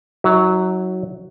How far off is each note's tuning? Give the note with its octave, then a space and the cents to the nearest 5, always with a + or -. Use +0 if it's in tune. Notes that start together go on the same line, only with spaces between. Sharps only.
F#3 +0 E4 -45